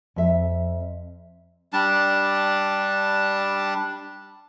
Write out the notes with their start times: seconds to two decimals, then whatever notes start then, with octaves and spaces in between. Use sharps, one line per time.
0.16 F2 E5
1.73 G3 D4 A5